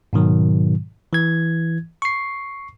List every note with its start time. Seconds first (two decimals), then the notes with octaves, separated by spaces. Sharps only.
0.13 G#2 B2 D#3 F#3
1.13 E3 G#6
2.02 C#6 C7